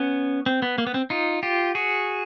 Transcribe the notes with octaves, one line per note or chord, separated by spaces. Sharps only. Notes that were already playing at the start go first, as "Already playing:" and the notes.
Already playing: B3 C#4
C4
B3
A#3
B3
C4
D#4 F4
F4 G4
F#4 G#4